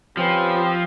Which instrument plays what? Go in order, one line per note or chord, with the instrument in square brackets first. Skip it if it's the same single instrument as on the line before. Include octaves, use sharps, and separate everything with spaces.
[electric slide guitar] F3 [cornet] C4 [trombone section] C#4 G4 B4